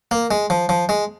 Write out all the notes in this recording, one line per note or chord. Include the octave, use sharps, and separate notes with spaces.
A#3
G#3
F3
F3
G#3